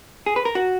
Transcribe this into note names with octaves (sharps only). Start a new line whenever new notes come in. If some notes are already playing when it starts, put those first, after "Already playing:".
G#4
B4
A#4
F#4